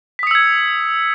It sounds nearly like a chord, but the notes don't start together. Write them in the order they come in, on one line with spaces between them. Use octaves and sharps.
B6 D#6 C#7 E6 G#6